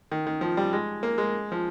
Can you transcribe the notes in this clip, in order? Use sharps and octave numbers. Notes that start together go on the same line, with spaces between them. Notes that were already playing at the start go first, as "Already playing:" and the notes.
D#3
D#3
F3
G3
G#3
A#3
G#3
F3